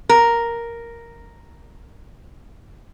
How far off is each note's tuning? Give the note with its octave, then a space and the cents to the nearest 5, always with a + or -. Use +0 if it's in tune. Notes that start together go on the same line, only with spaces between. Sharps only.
A#4 +0